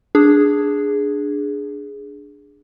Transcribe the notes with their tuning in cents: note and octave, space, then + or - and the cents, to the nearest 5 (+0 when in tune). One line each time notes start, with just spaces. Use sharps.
D4 +0 G#4 +0